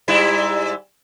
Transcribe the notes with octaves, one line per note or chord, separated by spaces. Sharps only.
G#2 G3 E4